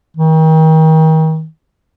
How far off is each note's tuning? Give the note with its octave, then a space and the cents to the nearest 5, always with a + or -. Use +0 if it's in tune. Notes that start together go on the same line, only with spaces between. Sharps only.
D#3 +35